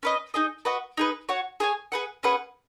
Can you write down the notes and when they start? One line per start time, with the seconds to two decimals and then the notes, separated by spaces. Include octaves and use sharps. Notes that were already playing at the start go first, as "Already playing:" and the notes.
0.03 C#4 B4 D#5
0.34 D#4 G#4 D#5
0.65 F#4 B4 D#5 F#5
0.97 D#4 G#4 B4
1.29 F#4 C#5 F#5
1.60 G#4 C#5 G#5
1.92 G#4 B4 F#5
2.23 C#4 G#4 B4 F#5